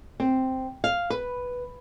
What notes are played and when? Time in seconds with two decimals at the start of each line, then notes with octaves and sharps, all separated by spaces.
0.20 C4
0.84 F5
1.10 B4